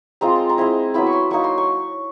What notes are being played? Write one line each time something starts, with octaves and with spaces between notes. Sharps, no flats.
G#3 C4 F4 A#5
A5
A#5
G#3 C4 E4
F#3 B3 E4 B5
C#6
C6
F#3 A#3 D#4 C#6
C6
C#6